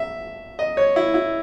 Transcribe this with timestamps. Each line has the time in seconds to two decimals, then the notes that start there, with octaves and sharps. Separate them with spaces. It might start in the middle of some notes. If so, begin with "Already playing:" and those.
Already playing: E5
0.59 D#5
0.77 C#5
0.96 E4
1.14 E4